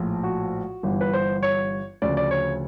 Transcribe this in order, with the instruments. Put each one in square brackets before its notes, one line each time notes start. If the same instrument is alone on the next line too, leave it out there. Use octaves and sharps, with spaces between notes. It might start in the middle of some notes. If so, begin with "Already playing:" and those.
Already playing: [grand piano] A#1 A2 F3
F#4
G1 G2 E3
B4
C5
C#5
D2 C#3 F3 D5
D5
C#5